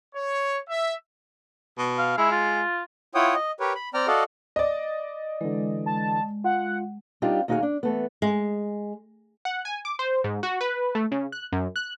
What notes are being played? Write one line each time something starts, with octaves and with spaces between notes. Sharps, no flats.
C#5
E5
B2
F5
G#3 E4
F4
E4 F4 C#5 F#5 G5 D#6
D#5
G4 A#4 B4 C#5
B5
C4 D5 G5 A#5 F6
F#4 A4 D5 D#5 F5 F#5
D5 D#5
D3 E3 G#3
A5
F4 F#5
G3 C4 D4 D#4 F4 G4
D#2 A#3 D#4 F#4 G#4 F5
D4
E3 A3 B3
G#3
F#5
G#5
D6
C5
G#2
F#4
B4
A3
C#3
F#6
F#2
F#6